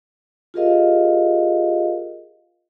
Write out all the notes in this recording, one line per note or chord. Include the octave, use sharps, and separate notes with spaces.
F4 G4 G#4 A#4 D#5 F5